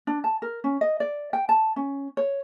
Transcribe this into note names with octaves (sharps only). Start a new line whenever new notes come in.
D4
A5
A#4
C#4
D#5
D5
G5
A5
C#4
C#5